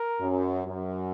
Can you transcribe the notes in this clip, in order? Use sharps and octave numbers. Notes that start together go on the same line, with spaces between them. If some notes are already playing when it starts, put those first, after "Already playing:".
Already playing: A#4
F#2
F#2